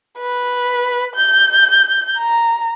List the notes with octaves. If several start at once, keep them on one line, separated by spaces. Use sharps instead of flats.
B4
G6
A#5